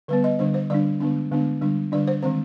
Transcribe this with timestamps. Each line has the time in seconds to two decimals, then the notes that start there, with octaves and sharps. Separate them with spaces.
0.08 D3 G3 B3 B4
0.24 D#5
0.39 D3 G3 D4 C5
0.54 C5
0.70 D3 G3 D4 D5
1.00 D3 G#3 B3 D4
1.31 D3 G#3 B3 D4
1.61 D3 G3 D4
1.92 D3 G3 D4 D5
2.07 C5
2.23 D#3 G#3 C4 C5